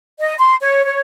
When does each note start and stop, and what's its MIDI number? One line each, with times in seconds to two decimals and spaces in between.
0.20 0.34 75
0.38 0.55 84
0.61 0.84 73
0.85 0.99 73